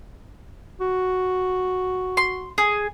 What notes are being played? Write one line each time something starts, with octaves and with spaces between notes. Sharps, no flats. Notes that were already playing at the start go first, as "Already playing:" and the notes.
F#4
C6
G#4